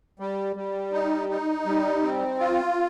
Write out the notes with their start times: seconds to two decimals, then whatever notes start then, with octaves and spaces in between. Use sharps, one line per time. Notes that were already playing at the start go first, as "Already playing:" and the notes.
0.20 G3
0.56 G3
0.93 D#4
1.29 D#4
1.66 G3
2.02 C4
2.39 F4